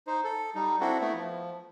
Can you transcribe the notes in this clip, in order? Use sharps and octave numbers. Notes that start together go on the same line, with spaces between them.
D#4 C5
A4
G3 D#4
C4 D4 E4 F#4 A4
A3 B3 E4
F3